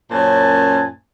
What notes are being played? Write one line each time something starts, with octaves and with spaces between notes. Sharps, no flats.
F#2 A#2 C#4 C5 G#5 A5